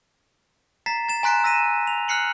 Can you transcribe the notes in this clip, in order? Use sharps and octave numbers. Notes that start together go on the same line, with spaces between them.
A#5 A6 B6 C7
A6 E7
G#5 A#5 C6 F#6 B6 D7
E6 A#6 B6 D#7 E7
F7
F6 F#6 C7 C#7 F#7